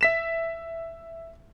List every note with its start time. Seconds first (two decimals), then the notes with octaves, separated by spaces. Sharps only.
0.01 E5 B6 E7